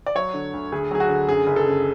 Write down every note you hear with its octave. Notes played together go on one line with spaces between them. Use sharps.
D5
F#3 C#5
D3
D2
D2 G#4
F#3 G#4
F#4
D3
F#2 G#4
F#1
A4
C#3